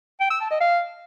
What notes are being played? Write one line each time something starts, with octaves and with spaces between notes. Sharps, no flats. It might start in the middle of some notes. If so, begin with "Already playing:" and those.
G5
E6
A5
D#5
F5